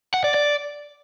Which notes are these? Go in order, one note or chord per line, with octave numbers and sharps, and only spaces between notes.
F#5
D5
D5